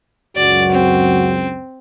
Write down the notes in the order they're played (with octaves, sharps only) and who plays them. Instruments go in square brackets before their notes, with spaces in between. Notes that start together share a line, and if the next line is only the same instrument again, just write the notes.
[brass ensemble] C#2 F#2 [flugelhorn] F#4 [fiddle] D5
[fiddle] C4